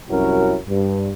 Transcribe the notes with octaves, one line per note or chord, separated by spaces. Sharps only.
C2 F#2 C#4 E4 F#4 A#4
G2